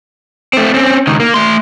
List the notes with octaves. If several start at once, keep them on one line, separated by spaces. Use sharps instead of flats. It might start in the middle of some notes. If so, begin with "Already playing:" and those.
A3 C4
C4 C#4
C#2 D#3
A#3
A3 C6